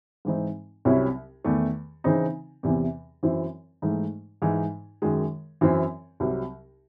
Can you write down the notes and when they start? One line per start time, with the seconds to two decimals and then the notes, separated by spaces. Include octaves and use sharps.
0.25 G#2 E3 C4 D#4
0.85 C2 C3 F#3 C#4 E4
1.44 E2 D#3 A3
2.04 C#3 E3 C4 D#4
2.63 E2 C3 E3
3.23 F#2 E3 C4 E4
3.82 G#2 E3 A3 D#4
4.42 G#2 E3 G#3 D#4
5.02 F#2 D#3 G#3
5.61 F#2 E3 C4 E4
6.20 C2 C3 F#3